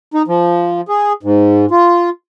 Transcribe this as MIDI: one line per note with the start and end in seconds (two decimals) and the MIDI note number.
0.14 0.22 63
0.28 0.81 53
0.89 1.13 68
1.23 1.66 44
1.71 2.10 65